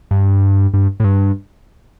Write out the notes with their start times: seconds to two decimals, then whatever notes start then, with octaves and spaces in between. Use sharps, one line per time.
0.11 G2
0.74 G2
1.00 A2
1.04 G2